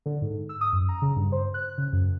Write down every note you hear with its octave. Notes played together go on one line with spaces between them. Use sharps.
D3
G#2
E6
D#6
F#2
A#5
C#3
G2
C5
F#6
C#3
F#2